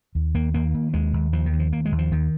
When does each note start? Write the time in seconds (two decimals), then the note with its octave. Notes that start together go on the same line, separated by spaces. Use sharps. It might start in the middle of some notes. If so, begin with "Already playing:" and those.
0.15 D#2
0.34 D#2 A#3
0.54 D#2 A#3
0.74 D#2
0.94 D#2 G#3
1.13 D#2
1.32 D#2 F3
1.46 D#3
1.53 D#2
1.59 F3
1.72 D#2 A#3
1.85 G#3
1.92 D#2
1.98 F3
2.12 D#2 D#3